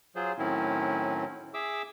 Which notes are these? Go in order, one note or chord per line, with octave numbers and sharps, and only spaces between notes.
F#3 F4 G#4 C5
A2 D#3 F#3 C4 C#4 E4
G#4 E5 D6 E6